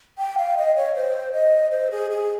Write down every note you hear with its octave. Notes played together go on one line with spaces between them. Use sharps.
G5
F5
D#5
C#5
C5
D#5
C5
G#4
G#4